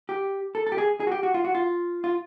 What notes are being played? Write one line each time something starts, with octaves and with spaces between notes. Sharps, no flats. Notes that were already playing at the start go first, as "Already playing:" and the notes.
G4
A4
A4
G4
G#4
G#4
F#4
G4
F#4
F4
F#4
F4
F4